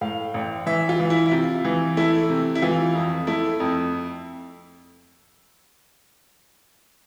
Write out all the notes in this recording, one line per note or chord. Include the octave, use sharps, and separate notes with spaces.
A2 F5
A1
E3 E5
F4
E3
E4
E4
C3 F4
E3
A3 E4
C3
E4
E3 F4
F2
A3 E4
F2